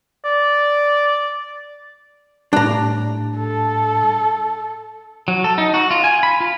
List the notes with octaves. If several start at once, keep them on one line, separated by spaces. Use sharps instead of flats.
D5
A2 G3 D4 A#5
A4
F#3
A4
D#4
F#4
F4
G#5
B5
F4